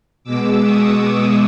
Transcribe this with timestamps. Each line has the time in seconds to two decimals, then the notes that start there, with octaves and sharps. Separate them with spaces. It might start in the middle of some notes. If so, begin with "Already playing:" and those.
0.24 B2 G#3 B3 D6 E6
0.62 C#6 D#6